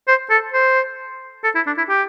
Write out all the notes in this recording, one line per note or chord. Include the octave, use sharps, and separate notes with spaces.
C5
A4
C5
A4
E4
D4
E4
G4